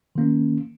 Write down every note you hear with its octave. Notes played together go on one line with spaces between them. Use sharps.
D#3 A#3 C#4